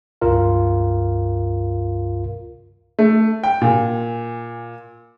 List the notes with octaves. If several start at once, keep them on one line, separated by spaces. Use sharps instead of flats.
C#2 G2 F4 A#4 F5
A3
G5
A#2